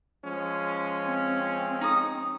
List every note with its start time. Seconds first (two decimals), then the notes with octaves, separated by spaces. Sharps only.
0.24 F3 G#3 C#4
1.04 C4
1.81 D#4 D#6